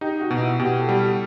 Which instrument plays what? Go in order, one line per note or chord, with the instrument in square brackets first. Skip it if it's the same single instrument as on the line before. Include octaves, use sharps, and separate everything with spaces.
[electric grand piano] D#4 [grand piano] G4
[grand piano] F#4
[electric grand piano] B2
[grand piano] E4
[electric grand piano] B2 [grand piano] G4
[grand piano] A4
[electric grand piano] G3
[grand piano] G4